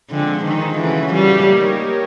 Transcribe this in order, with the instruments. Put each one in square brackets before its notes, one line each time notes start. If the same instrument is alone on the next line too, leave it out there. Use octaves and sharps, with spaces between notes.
[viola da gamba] D3 [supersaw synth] F3 G#3 C4
[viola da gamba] D#3
[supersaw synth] C#3 F3 A3 C#4 F#4 [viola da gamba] E3
[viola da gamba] G3
[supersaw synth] A#3 D#4 G4 A#4 C#5